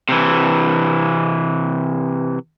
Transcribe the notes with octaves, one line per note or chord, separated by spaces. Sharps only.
C3 E3